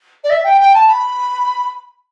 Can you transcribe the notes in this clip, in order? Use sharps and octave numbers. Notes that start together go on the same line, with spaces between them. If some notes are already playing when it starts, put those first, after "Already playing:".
D5
E5
G5
G5
A5
B5